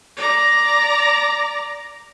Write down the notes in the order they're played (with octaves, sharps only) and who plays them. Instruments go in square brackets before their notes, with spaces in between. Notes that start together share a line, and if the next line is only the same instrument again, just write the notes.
[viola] D5 A#5